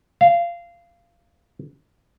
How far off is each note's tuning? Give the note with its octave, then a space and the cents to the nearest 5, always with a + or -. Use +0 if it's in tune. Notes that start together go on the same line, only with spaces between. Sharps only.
F5 -20